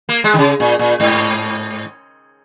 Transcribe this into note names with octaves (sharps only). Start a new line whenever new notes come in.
A#3
G#3
D#3
C#3
A#2
A#2
G#2